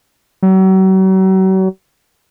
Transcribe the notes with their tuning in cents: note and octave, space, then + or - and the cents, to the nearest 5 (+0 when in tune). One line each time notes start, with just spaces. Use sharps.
F#3 +40